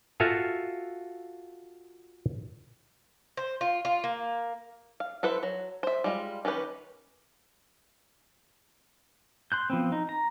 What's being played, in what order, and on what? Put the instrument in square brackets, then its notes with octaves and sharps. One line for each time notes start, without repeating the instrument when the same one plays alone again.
[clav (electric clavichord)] F4 F#4 A4 E5 F5 G#5
[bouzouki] C5
F4
F4
A#3
[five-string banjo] F5
E4 A4 B4 C5 E5
F#3
C5 E5
G3 G#3 F4
D#3 C#4 G4 B4
[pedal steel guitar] C6 F#6 G6
F3 B3 C4
D#4
A#5